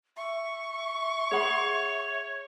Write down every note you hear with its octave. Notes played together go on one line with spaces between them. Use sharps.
E5 C#6
G#4 C#5 F#5 B5